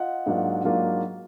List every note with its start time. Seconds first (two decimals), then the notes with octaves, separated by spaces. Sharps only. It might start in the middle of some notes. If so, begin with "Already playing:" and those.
Already playing: F4 D#5 F#5
0.26 G#2 F#3 A#3 D4 F4
0.64 G#2 F#3 A#3 D4 F4